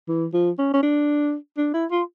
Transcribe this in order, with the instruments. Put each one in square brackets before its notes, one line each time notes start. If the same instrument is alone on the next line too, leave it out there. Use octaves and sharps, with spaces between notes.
[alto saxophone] E3
F3
C#4
C#4
D4
D4
E4
F4